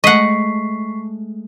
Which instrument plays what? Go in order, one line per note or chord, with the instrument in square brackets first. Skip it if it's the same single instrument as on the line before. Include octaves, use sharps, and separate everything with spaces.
[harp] G#3 A3 [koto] D#5 F#5 [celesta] C#6 B6 C7